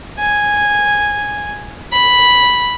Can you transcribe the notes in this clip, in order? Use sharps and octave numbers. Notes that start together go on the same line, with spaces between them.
G#5
B5